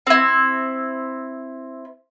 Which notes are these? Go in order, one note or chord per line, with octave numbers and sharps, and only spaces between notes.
C4 E4